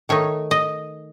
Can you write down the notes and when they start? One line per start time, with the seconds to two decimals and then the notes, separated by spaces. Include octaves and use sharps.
0.09 D#3 A3 D#4 C#5
0.51 D#5